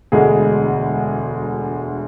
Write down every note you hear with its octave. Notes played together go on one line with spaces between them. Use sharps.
E1 D2 D3 G#3 G#4